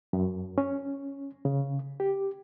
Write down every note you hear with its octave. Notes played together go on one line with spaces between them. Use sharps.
F#2
C#4
C#3
G4